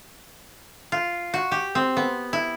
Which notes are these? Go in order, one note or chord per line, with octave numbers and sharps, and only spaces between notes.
F4
F#4
G4
C4
B3
E4